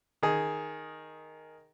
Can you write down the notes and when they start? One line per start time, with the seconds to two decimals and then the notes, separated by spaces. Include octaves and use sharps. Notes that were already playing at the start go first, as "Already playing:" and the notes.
0.23 D#3 G#4